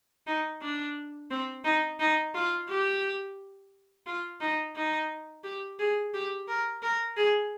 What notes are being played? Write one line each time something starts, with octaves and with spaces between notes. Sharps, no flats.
D#4
D4
C4
D#4
D#4
F4
G4
F4
D#4
D#4
G4
G#4
G4
A#4
A#4
G#4